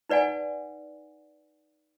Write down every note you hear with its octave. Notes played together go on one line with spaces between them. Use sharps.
D#4 B4 D5 F#5 G#5